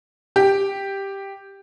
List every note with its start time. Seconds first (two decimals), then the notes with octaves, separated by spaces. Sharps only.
0.36 G4